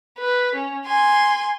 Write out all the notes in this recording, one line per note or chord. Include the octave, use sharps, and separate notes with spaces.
B4
C#4
G#5 C6